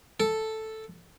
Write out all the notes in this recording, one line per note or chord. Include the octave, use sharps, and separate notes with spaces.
A4